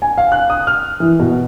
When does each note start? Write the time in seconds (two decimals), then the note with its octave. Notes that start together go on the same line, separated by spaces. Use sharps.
0.02 G#5
0.18 F5
0.32 F#6
0.50 D#6
0.67 F6
1.00 E3
1.19 B2